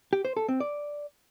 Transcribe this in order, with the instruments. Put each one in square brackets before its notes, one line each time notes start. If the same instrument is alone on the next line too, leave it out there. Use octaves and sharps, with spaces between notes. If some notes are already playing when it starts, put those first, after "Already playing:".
[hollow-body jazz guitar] G4
C5
A4
C4
D5